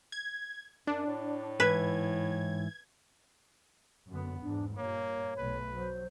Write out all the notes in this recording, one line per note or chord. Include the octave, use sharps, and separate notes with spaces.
G#6
F#2 D4
A2
G#2 E3 B4 G#6
F#2 D3 B3
E2 G#2 D4
G2 A#2 A#3 C#5
B1 A3 B4
F#3 C5